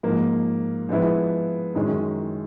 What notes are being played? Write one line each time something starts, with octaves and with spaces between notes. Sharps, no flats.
G#2 F3 A#3
F3 G#3 B3 E4
F#2 D#3 G#3 C#4